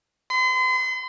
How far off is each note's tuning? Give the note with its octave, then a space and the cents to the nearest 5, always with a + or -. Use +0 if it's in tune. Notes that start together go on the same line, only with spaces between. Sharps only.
C6 -40